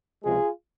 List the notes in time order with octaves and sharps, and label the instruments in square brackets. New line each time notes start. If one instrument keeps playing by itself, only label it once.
[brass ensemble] C#2 C3 F3 G#3 F4 G#4